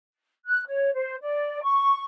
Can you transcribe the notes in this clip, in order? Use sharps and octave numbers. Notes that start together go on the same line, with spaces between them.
F#6
C#5
C5
D5
C#6